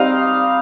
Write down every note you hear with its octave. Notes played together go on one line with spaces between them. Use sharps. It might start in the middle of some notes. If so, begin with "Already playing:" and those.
Already playing: G3 C4 D#4 D#5 F5